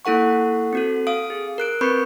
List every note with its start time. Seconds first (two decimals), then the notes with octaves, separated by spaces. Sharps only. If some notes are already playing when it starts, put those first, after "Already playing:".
0.05 A#3 E4 A4 F#5 C#6
0.73 C4 F#4 A4
1.07 F5 D#6 D7
1.30 G#4
1.58 A#4 F#6 D7
1.81 C4 A#4 B4 B5 C#6 G6